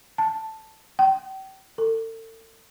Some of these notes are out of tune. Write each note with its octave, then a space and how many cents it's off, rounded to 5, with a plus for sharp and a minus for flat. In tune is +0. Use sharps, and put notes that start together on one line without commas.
A5 +0
G5 -35
A4 +40